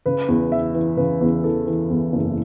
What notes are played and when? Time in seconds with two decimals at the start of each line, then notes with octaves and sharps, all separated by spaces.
0.06 C#3 B4
0.28 E2
0.52 E3 E5
0.75 E3
0.97 C#3 B4
1.21 E2
1.43 E3 A4
1.67 E3
1.90 E2
2.13 F#1